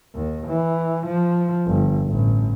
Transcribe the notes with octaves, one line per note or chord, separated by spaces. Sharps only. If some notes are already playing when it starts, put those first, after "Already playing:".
D#2
E3
F3
G1
A1